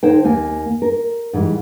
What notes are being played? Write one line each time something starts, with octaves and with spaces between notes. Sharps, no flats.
D3 D#4 C5 C#5 G5
D#2 A#3 G#5
A#4
G#2 E3 G3